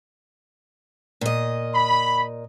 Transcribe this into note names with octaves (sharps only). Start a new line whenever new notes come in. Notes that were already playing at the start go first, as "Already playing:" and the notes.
A#2 D#5
B5